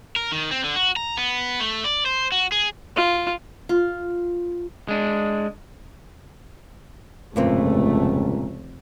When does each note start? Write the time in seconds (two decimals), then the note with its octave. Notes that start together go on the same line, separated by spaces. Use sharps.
0.16 A#4
0.32 D#3
0.51 C4
0.64 D3
0.76 F#4
0.96 A#5
1.17 B3
1.60 A3
1.84 D5
2.06 C5
2.32 F#4
2.52 G#4
2.96 F4
3.69 F4
4.88 G#3 D4
7.36 F1 C#2 G2 A#2 A3 C4